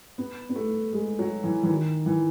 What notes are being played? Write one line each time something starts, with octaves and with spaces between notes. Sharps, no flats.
B3
B3
A3
G#3
F#3
E3
E3
D#3
E3